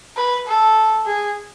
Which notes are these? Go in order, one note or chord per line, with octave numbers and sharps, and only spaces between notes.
B4
A4
G#4